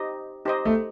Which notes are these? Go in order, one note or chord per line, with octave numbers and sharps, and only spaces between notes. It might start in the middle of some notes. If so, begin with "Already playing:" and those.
Already playing: D#4 G4 C5 D#5
D#4 G4 C5 D#5
A3